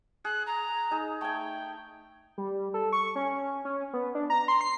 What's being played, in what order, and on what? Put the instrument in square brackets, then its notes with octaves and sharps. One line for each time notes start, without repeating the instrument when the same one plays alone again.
[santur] G#4 [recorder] F#6
[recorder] A#5
[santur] D#4 G#4
[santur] A3 G#5 [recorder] G5
[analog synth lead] G3
A4
C#6
C#4
C#4
B3
D4
A#5
C6
C7